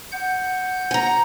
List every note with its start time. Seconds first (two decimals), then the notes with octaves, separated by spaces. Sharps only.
0.12 F#5 G6
0.91 G#5 A#5